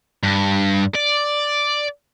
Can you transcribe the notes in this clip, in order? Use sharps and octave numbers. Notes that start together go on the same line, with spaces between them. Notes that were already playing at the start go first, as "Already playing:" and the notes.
G2
D5